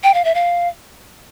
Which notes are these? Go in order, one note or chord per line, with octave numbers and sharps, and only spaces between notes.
G5
F5
E5
F5